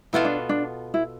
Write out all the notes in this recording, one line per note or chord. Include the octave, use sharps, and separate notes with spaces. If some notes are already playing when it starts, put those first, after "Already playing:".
B2 B3 E4 F4 A4
D4
D4
E4